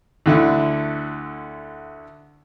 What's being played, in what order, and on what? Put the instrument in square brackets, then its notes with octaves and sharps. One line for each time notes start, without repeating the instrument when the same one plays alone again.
[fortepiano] D2 D3 E4